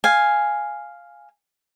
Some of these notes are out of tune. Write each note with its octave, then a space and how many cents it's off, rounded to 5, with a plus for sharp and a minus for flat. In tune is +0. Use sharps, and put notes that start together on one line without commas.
F5 +0 G#5 +0